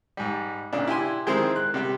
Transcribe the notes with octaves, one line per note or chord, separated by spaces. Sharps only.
G#2 G3
A#2 C#3 D4
E4 G4 G#5 C6
D#3 G#3 C4 E4 C5
F#6
C3 G3 G4